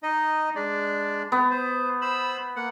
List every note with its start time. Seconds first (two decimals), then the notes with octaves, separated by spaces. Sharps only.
0.03 D#4 D#5
0.55 G#3 D4 D5
1.32 B3
1.51 C5
2.01 C5 B5 E6
2.56 A#3 F#5